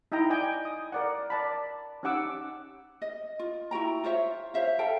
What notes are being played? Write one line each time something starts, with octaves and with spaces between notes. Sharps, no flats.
D#4 E4 D#5 G5 A#5
D5 D#5 G5 G#5
D#6
A#4 D5 F#5
D5 A5 B5
C#4 D#4 G4 F#5 D6 E6
D#5
F4
E4 F#4 G5 A#5
F4 C5 C#5 E5
C5 C#5 E5 F5
A4 F5 G5 A5